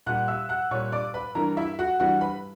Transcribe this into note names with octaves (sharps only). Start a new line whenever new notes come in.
A#2 G3 F#5 F#6
E5 E6
F#5 F#6
A#2 G3 C#5 C#6
D5 D6
B4 B5
G2 E3 G3 A#4 A#5
E4 E5
F#4 F#5
G2 E3 G3 F#4 F#5
B4 B5